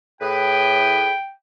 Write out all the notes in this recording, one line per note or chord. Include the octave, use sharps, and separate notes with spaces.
A2 G#4 B4 G5